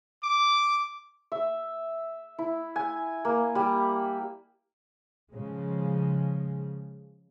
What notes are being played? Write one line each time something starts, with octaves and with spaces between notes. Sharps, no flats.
D6
E5
E4
G#5
A#3
G3
C#3 F3 G#3